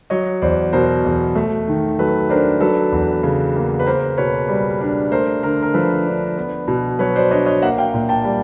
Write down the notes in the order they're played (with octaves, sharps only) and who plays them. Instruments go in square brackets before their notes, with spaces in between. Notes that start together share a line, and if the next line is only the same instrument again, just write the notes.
[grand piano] F#3 C#5 D#5
E2 C5 D5
B2 A#4 C5
E2
A3
D#3
F#3 A4 B4
D4 A#4 C5
F#3 A4 B4
E2
C#3
A#3
B4
A#3 A#4 C5
B2 B4 C#5
G3
D4
A3 A#4 C5
D3 A#4
A#4
F3 A4 B4
D4
B3
B2
F#3 B4 C#5
C5 D5
D4 C#5 D#5
C#5 D#5
A#3 E5 F#5
F5 G5
A#2
G5 A5
G3